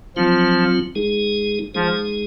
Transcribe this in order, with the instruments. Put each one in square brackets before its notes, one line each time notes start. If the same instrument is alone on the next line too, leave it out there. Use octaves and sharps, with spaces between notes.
[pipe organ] F3 [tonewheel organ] F#3 C4 F4
[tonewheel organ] G#3 D#4 G#4
[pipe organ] F3 [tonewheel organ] G#3 D#4 G#4